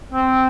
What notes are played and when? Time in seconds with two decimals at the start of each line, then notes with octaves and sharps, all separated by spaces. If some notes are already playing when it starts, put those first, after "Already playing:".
0.12 C4